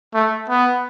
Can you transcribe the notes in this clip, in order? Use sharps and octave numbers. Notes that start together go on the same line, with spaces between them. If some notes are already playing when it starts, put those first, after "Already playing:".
A3
B3